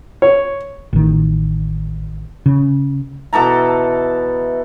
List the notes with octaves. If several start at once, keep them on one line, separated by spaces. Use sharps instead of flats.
C#5
A1 D#3
C#3
B2 E3 A4 A#5